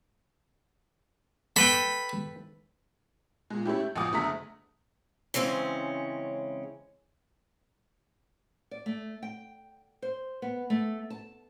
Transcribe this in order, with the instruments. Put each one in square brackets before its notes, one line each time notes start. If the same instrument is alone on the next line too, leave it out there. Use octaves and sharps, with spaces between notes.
[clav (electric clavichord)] A4 B4 G5 [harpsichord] B5
[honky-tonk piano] A#2 G#3
A3 C#4 E4 G4
G6
A1 D2 F3 G#5 D6 D#6
F#1 D3 A3 E5 A#5 B6
[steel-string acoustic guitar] C#3 E3 G#3 C4 C#4
[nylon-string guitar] D5
A3
G5
C5
B3
A3
A5